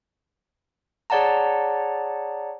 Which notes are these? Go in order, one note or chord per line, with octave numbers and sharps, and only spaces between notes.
G#4 C#5 D5 F#5 A5 A#5